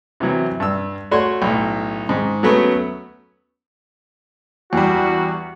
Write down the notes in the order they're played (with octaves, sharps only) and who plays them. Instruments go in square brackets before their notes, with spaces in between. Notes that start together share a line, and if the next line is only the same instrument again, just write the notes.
[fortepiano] C3 E3 F#3 E4
G2 E6
A3 F#4 C#5 C6
B1 A2
G#2 D#3
F#3 A3 B3 C#4
[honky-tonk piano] E2 G3 [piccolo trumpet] F#4